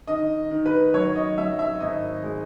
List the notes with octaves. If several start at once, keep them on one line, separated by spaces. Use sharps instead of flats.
D#3 D#5
D#3
B4
F#3 C#5
D#5
F#3 E5
E5
G#1 D#5
G#3